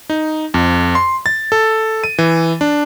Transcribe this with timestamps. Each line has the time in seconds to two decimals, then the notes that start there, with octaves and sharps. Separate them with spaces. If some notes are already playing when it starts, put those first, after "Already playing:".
0.10 D#4
0.54 F2
0.95 C6
1.26 A6
1.52 A4
2.04 D#7
2.18 E3
2.61 D4